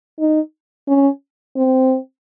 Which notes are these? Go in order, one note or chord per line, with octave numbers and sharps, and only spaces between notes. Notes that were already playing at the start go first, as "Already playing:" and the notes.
D#4
C#4
C4